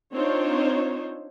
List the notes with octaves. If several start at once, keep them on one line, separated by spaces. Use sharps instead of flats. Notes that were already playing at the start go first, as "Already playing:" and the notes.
C4 D4 D#4 F4 C5 C#5